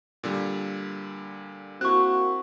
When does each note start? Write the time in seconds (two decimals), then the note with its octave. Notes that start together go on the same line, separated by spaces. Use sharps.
0.23 A#2 D3 G3
1.81 A#3 C4 E4 F#4 C#6 F#6